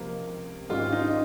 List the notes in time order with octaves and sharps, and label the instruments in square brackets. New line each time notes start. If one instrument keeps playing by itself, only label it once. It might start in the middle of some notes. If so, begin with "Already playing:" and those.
Already playing: [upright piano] C#2 C3 F3 [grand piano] A#3
[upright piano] G#1 G#2 G3 C#4 [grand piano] F4
[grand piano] D#4